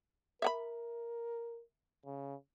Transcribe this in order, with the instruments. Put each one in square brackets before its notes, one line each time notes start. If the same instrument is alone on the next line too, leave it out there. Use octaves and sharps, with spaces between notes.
[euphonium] A#4 [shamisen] E5 F#5 B5
[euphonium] C#3